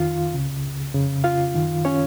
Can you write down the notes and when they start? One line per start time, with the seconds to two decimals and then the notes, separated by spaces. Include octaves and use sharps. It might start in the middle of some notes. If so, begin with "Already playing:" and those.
Already playing: F2 D#3 F4 F5
0.32 C#2 C#3
0.93 F2 C#3
1.24 F4 F5
1.55 F#2 D#3
1.85 C#4 C#5